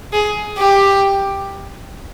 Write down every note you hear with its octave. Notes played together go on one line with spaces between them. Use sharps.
G#4
G4